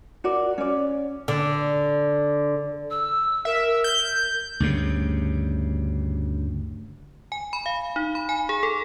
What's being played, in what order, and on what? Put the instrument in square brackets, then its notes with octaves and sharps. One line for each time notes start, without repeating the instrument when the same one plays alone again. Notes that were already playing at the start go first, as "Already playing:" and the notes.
[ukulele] F#4 A#4 D5
C#4 D5
[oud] D3
[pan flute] E6
[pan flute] A#4 [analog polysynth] E5
[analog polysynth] G6
[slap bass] D2 G2 C#3
[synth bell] G#5
B5
F5
D#4
B5
G#5
G#4
A4